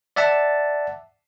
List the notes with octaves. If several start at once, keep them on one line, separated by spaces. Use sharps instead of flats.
D5 E5 F#5 A5